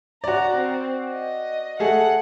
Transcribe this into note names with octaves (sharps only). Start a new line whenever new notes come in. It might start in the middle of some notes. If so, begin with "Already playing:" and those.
F#4 D5 A#5
C4
D#5
A3 G#4 F#5